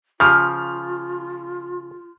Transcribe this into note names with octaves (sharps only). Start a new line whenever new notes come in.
C#3 F3 F4 F6